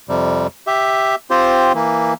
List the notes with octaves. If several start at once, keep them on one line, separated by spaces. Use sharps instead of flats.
F2 C3 G3
G4 E5
C4 F4 G4 C5
E3 A#3